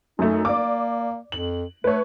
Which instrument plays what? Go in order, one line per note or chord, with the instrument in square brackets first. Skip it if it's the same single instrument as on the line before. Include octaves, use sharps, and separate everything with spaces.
[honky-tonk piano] F#2 A3 [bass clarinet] D#4
[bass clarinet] A#3 [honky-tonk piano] D5 D6
[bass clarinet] F2 [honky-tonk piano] F#7
[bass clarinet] A3 [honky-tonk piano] B4 C#5